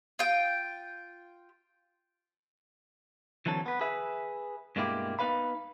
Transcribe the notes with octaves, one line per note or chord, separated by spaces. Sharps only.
F4 G5
D3 E3 F#3 C4 A4
B3 B4
G#4 B4 E5
G2 B2 G#3 A#3 E4 G4
B3 D#4 B4 F5 B5